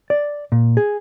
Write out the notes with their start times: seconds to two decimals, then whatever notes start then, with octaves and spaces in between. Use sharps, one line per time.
0.10 D5
0.52 A#2
0.77 G#4